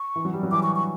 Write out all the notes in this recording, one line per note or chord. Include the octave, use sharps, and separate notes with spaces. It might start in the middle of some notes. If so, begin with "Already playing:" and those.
Already playing: C#6
E3
F#3
G3
F#3
E3 D6
C#6
C#6